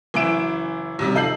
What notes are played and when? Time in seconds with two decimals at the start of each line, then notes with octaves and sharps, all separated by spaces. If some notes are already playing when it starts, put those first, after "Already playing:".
0.14 F#1 E3 E4 D7 E7
0.99 D#2 C3 G3
1.15 F2 D#4 A4 G6 C7 F#7